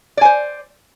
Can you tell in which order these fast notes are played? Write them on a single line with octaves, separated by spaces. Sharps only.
D5 G#5 C5